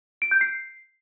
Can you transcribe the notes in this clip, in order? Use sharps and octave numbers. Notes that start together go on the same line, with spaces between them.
D7
G6
C7